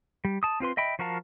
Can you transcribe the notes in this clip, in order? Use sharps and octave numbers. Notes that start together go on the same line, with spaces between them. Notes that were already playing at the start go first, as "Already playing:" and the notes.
G3
A5 D#6
C4 F4 B4 C6
D#5 E5 G5 B5
F3 F#4 A#4 F5 A5